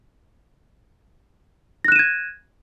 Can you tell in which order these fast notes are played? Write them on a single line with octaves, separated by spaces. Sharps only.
A#6 F#6 E7 D#7 G#6